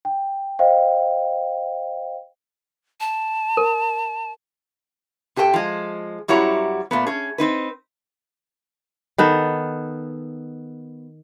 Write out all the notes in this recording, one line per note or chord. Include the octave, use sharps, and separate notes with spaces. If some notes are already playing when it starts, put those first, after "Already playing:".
G5
C5 D#5 F5 G5
A5
A#4
C3 G4 A4 B4 G5
F3 G#3
F#2 G3 E4 F#4 C#5 A#5
A#2 A3 B3
C#4 G#4
C4 D#4 B4
D#3 B3 A4